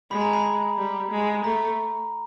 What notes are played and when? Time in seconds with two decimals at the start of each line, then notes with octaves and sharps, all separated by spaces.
0.11 G#3 B5
0.21 A#5
0.33 B5
0.77 G3
1.11 G#3
1.44 A3 A#5